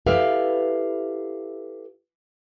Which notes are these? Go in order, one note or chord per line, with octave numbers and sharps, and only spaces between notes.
E4 G4 A4 B4 E5 F5